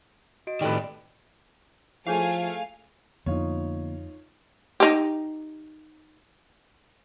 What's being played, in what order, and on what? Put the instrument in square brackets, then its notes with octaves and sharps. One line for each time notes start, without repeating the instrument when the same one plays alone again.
[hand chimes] F#4 D#5 D7
[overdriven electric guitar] A2 D#3 [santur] G3 A4 B4
[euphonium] F3 [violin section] A3 G#5 [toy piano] E4 G#4 C#5 [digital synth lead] F5
[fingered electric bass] F2 [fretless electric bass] D3 A#3 B3 [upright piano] D#4 F4 C#5
[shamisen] D#4 G4